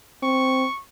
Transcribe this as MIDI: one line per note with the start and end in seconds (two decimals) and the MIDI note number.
0.23 0.65 60
0.23 0.81 85